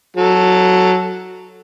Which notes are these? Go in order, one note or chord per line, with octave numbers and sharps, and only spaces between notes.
F#3 A4